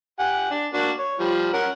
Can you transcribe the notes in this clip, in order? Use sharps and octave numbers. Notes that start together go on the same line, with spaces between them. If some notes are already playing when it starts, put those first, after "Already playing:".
G4 F#5 G#5
D4
A#3 D4 F#4
C#5
F3 G3
C#4 A#4 F#5